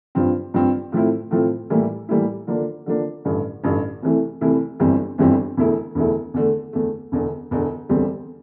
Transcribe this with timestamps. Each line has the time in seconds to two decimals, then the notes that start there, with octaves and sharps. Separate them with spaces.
0.15 G2 F3 C4
0.54 G2 F3 C4
0.92 A2 F3 A3 C4 E4
1.31 A2 F3 A3 C4 E4
1.70 A2 E3 G3 A#3 E4
2.09 A2 E3 G3 A#3 E4
2.47 D3 F3 A#3 D4
2.86 D3 F3 A#3 D4
3.25 A1 G2 D3
3.64 A1 G2 D3
4.03 C2 C3 E3 A3 E4
4.41 C2 C3 E3 A3 E4
4.80 G1 F2 E3 G3 C4
5.18 G1 F2 E3 G3 C4
5.57 E1 E2 D3 A3 E4
5.95 E1 E2 D3 A3 E4
6.34 E2 D3 A3
6.73 E2 D3 A3
7.12 E1 E2 D3
7.51 E1 E2 D3
7.89 E1 E2 D3 G3 C4